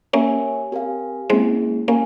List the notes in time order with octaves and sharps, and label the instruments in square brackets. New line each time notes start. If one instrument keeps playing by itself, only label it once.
[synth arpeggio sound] A#3 C#4 [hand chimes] G4 A#4 C#5 E5 G#5
[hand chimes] C4 G4 A#4 F5 G#5
[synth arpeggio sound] G#3 C4 [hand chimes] A#3 C#4 E4 G#4
[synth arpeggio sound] A#3 C#4 [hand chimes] G4 A#4 F5 G#5